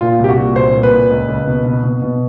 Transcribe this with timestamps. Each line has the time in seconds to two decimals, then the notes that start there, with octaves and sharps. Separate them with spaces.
0.01 A#2 F4
0.19 C2
0.24 G4
0.29 F#4
0.38 A#2
0.56 C2 C5
0.75 A#2
0.83 B4
0.92 A#2
1.10 C#2
1.28 C#2
1.47 B2
1.65 B2
1.83 B2
2.02 B2